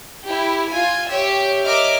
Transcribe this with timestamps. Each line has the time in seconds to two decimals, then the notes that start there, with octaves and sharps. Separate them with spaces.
0.24 E4 G4
0.71 F4 G#5
1.10 G4 C#5 E5
1.64 A#4 C#5 D#5 E5 D6 F6